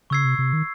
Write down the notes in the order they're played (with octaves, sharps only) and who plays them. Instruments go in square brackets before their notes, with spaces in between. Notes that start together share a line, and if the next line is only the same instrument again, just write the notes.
[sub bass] C#3 [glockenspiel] C#6 E6 G#6 C7
[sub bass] C3
C3
D#3